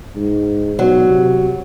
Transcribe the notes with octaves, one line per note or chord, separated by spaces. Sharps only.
G#2
B2 F#3
C3